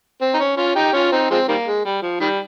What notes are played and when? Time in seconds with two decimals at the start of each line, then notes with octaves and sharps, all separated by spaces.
0.21 C4
0.34 D#4
0.40 C#4
0.57 C#4 F4
0.75 D#4 G4
0.93 C#4 F4
1.12 C4 D#4
1.30 F3 G#3 C4
1.48 D#3 G3 A#3
1.66 G#3
1.85 G3
2.02 F3
2.20 D#3 G3